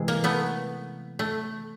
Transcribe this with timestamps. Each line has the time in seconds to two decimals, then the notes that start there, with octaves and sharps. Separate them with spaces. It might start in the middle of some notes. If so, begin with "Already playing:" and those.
Already playing: C3 E3 G#3
0.08 A#3
0.24 A3 B3
1.19 A3